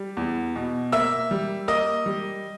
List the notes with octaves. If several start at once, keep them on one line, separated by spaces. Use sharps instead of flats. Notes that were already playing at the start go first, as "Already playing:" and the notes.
Already playing: G3
E2
B2
A#3 E5 E6
G3
A#3 D#5 D#6
G3